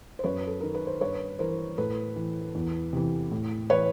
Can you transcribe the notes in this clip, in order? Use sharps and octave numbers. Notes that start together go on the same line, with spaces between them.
C5
F#2 B4 C#5
A4
D#3 A#4
B4
C5
G2 B4 C#5
E3 A#4 C5
A2 A4 B4
E3
E2
C3 E3
A2
E3 B4 C#5